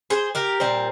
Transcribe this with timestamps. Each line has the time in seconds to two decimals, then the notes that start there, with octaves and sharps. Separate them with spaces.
0.10 G#4 C5
0.35 G4 A#4
0.60 A#2 G3 C4